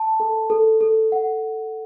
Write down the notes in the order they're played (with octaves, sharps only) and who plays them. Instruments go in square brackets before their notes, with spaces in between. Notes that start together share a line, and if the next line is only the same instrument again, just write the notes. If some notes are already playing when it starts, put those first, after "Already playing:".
Already playing: [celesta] A5
A4
A4
A4
F#5